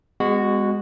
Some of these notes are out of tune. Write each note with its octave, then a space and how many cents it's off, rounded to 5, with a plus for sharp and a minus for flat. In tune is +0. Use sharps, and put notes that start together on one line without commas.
G#3 -25 B3 +30 F#4 +0